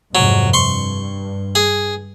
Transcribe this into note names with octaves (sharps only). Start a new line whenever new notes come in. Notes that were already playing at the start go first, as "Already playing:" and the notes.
F2 G#2 C3 F#3
G2 C6 C#6
G#4